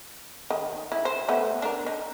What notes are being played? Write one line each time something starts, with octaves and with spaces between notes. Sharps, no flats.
D#3
E4
C5
A3 B3
D4 A#4
D#4